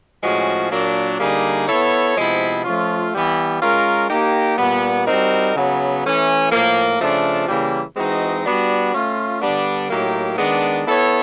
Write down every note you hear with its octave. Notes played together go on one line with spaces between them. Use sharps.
A2 F3 G#3 C#4 F#4
A#2 F#3 A#3 D4
D3 G3 A#3 D#4 G#4
B3 E4 A4 C#5
C3 F3 G#3 B3 E4
F3 A3 C#4 F4
E3 G3 B3
G#3 C#4 F4 A#4
A#3 D#4 G4
A#2 G3 B3
G3 C4 D#4 F#4 A#4
C#3 F#3 B3
E3 A3 C#4
A2 F3 A#3
C#3 F3 A3 D4 F4
C#3 E3 G3 A#3
E3 G#3 C4 D#4 F#4
G3 B3 D4 F#4
A3 C#4 F4
D3 G3 B3 D4
A2 F#3 A#3 D#4 G4
D#3 G#3 B3 D4
B3 E4 A4 C#5